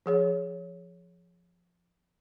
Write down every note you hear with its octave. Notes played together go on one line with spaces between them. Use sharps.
F3 G#4 C#5